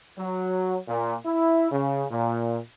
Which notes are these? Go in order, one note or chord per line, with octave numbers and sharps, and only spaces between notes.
F#3
A#2
E4
C#3
A#2